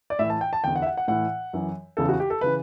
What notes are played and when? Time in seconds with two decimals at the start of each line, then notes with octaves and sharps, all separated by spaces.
0.10 D5
0.19 A2 E3 E5
0.30 A5
0.41 G5
0.53 A5
0.64 E2 D3 G5
0.75 F#5
0.82 E5
0.87 F#5
0.97 F#5
1.08 A2 E3 F#5
1.53 F#2 E3
1.97 E2 C#3 E3 A4
2.09 F#4
2.20 G4
2.30 A4
2.41 C#3 E3 B4